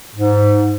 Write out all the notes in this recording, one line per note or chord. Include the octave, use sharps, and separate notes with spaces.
G#2